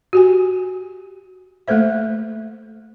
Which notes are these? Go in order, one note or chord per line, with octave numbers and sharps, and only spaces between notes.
F#4 G4 G#5
A3 A#3 A4 C5 E5